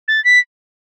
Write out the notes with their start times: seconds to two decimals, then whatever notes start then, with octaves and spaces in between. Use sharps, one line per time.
0.08 A6
0.25 B6